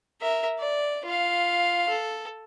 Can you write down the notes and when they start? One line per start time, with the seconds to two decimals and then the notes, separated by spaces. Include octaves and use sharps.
0.21 A#4 E5
0.59 D5
1.05 F4 F5
1.89 A4